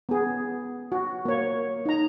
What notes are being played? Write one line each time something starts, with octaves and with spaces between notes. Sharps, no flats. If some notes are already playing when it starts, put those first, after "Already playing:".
B3 G#4
F#4
A#3 C#5
D#4 A#5